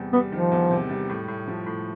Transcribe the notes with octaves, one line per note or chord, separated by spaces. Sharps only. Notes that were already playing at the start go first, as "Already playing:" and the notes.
Already playing: E2 C3 G3
G3 B3
D#3 F3
E2
C3
G3
A2
A2
F3
A2